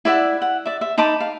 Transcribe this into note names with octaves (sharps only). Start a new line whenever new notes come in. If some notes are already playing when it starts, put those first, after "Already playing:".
E4 D5 E5 F#5
F#5
D5 E5
E5
D#4 A5 B5 D6
F5